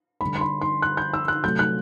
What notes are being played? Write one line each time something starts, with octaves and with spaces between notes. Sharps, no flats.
D3 G3 B5
C6
B5
C6
F#6
G6
E6
F#6
C3 F#3 A3 G6
F#6